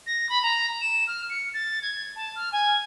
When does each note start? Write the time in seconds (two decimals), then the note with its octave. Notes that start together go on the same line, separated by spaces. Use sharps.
0.06 A#6
0.29 B5
0.42 A#5
0.81 E7
1.07 F6
1.29 C#7
1.53 A6
1.82 G#6
2.15 A5
2.35 F6
2.52 G#5